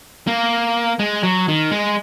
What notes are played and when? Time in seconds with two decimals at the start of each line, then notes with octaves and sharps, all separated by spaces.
0.27 A#3
0.99 G#3
1.23 F#3
1.48 D#3
1.71 G#3